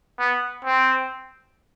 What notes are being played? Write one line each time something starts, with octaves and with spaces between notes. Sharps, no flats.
B3
C4